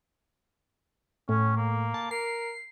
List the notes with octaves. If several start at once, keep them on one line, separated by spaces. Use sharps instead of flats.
A2 C#4
A#3
A5
A#4 C7